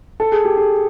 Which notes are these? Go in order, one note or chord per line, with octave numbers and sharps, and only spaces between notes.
A4
G#4
G4
G#4